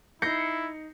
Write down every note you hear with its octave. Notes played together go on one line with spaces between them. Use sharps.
D#4 E4 G6 A#6 C7 C#7